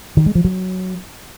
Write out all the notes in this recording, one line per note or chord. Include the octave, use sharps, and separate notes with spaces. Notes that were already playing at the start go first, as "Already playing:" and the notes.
D#3
G#3
F3
F#3